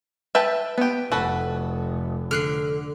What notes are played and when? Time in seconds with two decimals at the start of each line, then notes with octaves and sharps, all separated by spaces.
0.35 B4 E5 G5 A5
0.78 B3 G4 B4
1.12 F1 F#4 A4 B4
2.31 D3 F6 F#6 C7